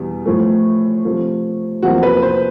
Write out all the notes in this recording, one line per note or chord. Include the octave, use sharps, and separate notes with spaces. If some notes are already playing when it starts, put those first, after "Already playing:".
Already playing: E2 B2 G3
A2 F3 A3
C3 F3 A3
E2 C3 F3 A#3 F#4
B4
C5